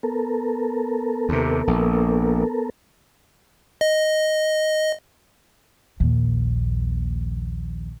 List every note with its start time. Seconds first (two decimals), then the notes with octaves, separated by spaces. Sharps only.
0.03 B3 A4 A#4
1.29 D#2 C3
1.67 A#1
3.81 D#5
6.00 A#1 D#2